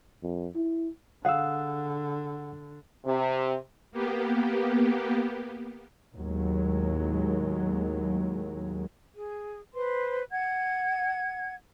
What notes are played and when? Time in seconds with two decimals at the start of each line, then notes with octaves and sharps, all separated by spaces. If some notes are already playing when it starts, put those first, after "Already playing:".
0.23 F2
0.56 E4
1.25 D3 G#4 F5 F#5 E6
3.05 C3
3.92 A#3 B3 G4
6.16 D#2 A2 F#3 G#3
9.14 G#4
9.75 B4 C5 C6
10.30 F#5 G#6